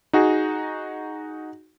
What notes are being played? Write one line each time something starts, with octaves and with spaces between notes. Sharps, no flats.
D#4 F#4 G#4